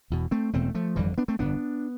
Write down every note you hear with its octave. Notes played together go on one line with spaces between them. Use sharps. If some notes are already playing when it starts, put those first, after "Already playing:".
E1 E2 B2
A3 C4
E1 E2 B2 A3 C4
F3 A3
G1 F2 D3 E3 G3
B3 D4
A3 C4
G1 F2 D3 B3 D4